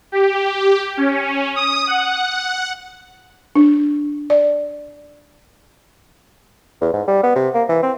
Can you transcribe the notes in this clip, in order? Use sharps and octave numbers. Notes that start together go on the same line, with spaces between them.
G4
C#4
D#6
F#5
D4
D5
E2
G#2
G3
B3
C3
A#3
E3
C4